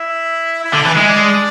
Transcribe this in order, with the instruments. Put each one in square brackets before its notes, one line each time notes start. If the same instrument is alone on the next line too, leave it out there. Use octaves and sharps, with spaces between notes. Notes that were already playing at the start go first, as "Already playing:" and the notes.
Already playing: [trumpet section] E4 E5
E4 E5
[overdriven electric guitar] D3
E3
G#3
[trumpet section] D4 D5